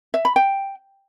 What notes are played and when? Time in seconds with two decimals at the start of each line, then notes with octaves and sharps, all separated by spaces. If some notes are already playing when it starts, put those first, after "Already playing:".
0.14 E5
0.25 B5
0.36 G5